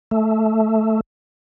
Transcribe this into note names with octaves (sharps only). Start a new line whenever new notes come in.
A3